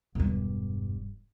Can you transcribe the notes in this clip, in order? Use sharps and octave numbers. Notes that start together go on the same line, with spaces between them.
E1 G2